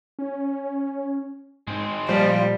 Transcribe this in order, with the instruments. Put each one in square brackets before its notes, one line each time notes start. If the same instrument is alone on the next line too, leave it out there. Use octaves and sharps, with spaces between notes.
[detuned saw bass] C#4
[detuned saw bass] G#2 [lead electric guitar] G#3 C4
[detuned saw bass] A#2 [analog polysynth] F3 [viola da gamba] G3